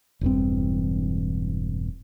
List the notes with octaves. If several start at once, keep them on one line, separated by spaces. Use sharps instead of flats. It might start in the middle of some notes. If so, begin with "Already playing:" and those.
E1 E2 G2 C4